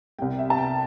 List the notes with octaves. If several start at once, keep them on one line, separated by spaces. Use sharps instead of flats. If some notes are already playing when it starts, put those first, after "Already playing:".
C2 C3 G3 G5
E5
A5
G5